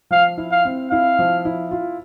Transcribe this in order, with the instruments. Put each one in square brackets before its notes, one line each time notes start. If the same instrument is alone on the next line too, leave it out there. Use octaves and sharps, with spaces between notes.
[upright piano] F3 [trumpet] F5
[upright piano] E4
[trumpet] F5
[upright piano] C4
[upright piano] E4 [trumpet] F5
[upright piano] F3
E4
F4